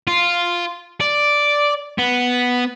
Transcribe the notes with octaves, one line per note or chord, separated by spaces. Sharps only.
F4
D5
B3